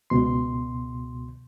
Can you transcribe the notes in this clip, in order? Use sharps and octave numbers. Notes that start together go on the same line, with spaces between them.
C#2 B2 C6